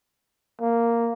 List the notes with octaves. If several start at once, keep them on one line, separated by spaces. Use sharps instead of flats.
A#3